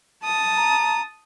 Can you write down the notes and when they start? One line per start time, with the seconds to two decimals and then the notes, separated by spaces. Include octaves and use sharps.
0.24 A5 D#6
0.57 A#5